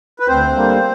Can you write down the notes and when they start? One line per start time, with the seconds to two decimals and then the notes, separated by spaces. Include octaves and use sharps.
0.20 B4
0.28 D2 C4 C5
0.53 D3 G3 A#3